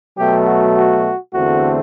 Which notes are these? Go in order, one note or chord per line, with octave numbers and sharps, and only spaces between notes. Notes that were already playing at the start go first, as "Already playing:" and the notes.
B2 F#3 A3 G4
F#4
F#4
E2 D3 A3 C4 F#4